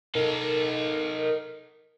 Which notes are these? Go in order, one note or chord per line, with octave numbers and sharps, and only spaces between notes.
D#4 A4 A#4